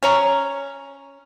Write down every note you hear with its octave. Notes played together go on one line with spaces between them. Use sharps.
C#4 C#5 A#5